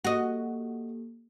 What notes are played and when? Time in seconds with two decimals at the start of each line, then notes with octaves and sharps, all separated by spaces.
0.05 A#3 F#4 G4 A4 D#5